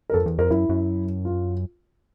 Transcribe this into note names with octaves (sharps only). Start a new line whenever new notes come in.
A#4
F2 A4
E2
F2 A#4
F#2 E4
F#2
F4